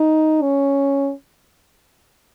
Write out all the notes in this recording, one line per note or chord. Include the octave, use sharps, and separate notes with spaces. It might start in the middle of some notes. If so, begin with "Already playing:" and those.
Already playing: D#4
C#4